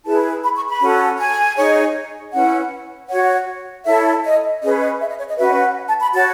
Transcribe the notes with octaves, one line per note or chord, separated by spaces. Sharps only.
E4 G#4 B4 A5
B5
C#6
B5
C#4 F#4 A4
G#5
D#4 G#4 C#5
C#4 E4 B4 F#5
F#4 C#5 F#5
E4 A4 C#5 E5
D#5
C#4 G#4 B4 D#5
D#5
E5
D#5
C#5
D#5
C#4 F#4 B4 E5
F#5
A5
B5
F#4 C#5 A5